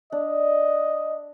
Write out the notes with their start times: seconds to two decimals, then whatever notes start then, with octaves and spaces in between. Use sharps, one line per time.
0.12 D4 D#5